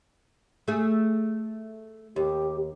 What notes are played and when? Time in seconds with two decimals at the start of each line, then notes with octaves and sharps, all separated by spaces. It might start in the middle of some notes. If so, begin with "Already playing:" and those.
0.68 A3 G#4
2.16 D#2 G4